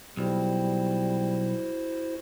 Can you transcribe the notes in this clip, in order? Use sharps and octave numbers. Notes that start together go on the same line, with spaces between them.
B1 G3 E4 F#4 C5